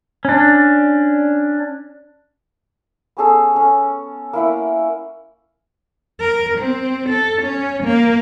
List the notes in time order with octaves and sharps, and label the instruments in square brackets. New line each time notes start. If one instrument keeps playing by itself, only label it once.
[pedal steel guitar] C#4 D4
[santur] B3 C#4 G#4 A4
C#4 A4
A#3 E4 F#5
[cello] A#4
C4
A4
C#4
A#3